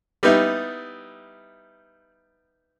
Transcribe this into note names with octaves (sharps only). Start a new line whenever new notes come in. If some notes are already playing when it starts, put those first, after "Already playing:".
G3 B3 D#4 E4